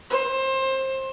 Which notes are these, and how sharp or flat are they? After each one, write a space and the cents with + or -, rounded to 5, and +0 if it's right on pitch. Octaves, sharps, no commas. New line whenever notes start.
C5 +25